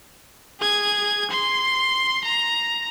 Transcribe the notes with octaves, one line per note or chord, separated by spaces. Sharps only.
G#4 G#6
C6
A#5